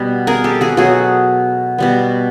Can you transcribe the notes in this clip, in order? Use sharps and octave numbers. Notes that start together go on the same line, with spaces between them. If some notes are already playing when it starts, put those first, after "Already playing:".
Already playing: B2 G3 B3
G#4 A#4
G4 A4
F#4 G#4
B2 F#3 A3 F#4 G#4
B2 G3 B3